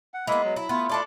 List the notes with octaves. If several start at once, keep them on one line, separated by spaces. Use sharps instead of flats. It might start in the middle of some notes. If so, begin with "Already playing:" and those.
F#5
G#3 A#3 B3 E4 E5
F#3
E4
A3 B3 E4 F4
D4 A4 D5